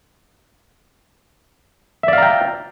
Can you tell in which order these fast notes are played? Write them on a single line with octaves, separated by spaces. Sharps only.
E5 D5 F5 A#5 G5